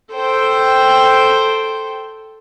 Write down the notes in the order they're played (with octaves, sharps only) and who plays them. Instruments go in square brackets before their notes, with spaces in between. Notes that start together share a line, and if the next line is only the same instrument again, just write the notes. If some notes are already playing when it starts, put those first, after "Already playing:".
[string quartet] A4 C5 G5